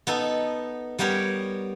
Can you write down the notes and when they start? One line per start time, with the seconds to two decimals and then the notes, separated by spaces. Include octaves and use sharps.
0.07 B3 D#4 A4
0.99 G3 B3 G4 A#4 C#5